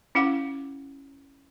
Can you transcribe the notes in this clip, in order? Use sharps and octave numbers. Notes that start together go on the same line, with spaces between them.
C#4 E4 F5 F#5